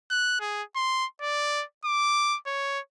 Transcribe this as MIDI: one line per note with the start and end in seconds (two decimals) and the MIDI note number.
0.10 0.36 90
0.40 0.62 68
0.76 1.06 84
1.22 1.64 74
1.85 2.37 86
2.46 2.80 73